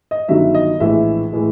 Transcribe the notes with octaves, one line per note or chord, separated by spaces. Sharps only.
D#5
G1 G2 D#3 F#3 E5
D#5
A#1 A2 E3 G#3 E5
A2 E3 G#3